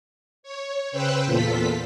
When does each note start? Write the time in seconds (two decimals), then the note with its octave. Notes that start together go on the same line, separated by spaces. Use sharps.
0.43 C#5
0.92 C#3 B4 C5 G5 E6 F#6
1.25 E2 A#2 F4 A4 B6